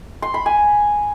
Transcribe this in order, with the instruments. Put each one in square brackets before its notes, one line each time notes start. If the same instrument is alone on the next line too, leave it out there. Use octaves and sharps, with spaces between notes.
[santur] C6
B5
G#5